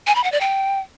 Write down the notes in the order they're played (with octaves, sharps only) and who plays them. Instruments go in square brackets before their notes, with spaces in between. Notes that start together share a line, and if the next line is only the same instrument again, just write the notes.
[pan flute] G#5
B5
F#5
D5
G5